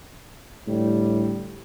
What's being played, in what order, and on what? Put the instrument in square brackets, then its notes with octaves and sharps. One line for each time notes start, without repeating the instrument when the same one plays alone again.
[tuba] A2 [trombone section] D3 G3